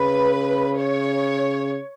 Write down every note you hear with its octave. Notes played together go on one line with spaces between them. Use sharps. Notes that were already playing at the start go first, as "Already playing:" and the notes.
Already playing: C#3 B4
C#5